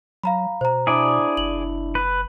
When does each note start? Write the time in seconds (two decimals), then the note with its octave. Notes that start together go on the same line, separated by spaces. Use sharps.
0.23 F#3 F5 A#5 B5
0.61 B2 C5 A#5
0.87 D4 E4 G#4 D5
1.37 F#1 F#7
1.95 B4